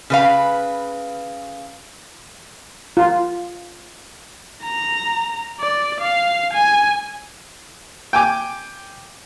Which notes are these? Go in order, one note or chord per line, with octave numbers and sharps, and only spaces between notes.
C#3 B4 F5
F4
A#5
D5
F5
G#5
G5 G#5 D6